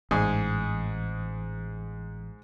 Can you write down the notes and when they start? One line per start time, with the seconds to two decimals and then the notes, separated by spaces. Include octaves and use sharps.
0.11 A1 G#2 G#4 G#5